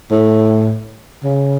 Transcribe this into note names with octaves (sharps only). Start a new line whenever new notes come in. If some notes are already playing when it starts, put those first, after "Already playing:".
A2
C#3